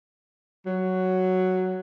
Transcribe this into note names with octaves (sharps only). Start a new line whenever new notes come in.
F#3